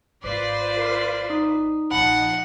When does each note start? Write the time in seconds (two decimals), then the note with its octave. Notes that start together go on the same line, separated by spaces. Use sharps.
0.24 G#1 F4 B4 C5 D5 D6
0.78 A#4
1.30 D#4 D#6
1.91 A#1 F3 C4 D#4 F#5 A5 B5